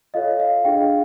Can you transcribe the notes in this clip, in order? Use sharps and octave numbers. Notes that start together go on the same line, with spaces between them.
F4 A4 C#5 D#5 F5
D#5 F5
D4 F4 G#4 F5 G5